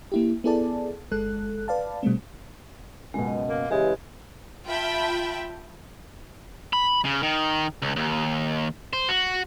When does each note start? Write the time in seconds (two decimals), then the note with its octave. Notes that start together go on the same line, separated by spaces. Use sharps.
0.12 A#3 E4 G4
0.44 B3 E4 G#4 A4 D5 A5
1.11 G1 G#3 A4 F#6
1.68 B4 D5 F5 A5
2.03 B2 G3 A3 C4
3.14 C#2 F#2 B2 G#3
3.27 D#5
3.49 A#3
3.71 C#3 E3 G#3 G4
4.66 F4 E5 G5 A5 B5
6.73 B5
7.05 C#3
7.23 D#3
7.82 C#2
7.96 D#2
8.93 C5
9.09 F#4